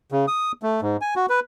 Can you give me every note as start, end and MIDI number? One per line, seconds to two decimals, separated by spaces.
0.12 0.26 49
0.28 0.52 87
0.63 0.81 57
0.82 0.97 44
1.01 1.14 80
1.16 1.26 66
1.29 1.40 71